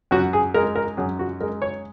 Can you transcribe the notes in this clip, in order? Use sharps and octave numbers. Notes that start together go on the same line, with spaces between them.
F#2 F#4
G#4
G#3 A#4
A#4
F#2 G#4
F#4
G#3 A#4
C#5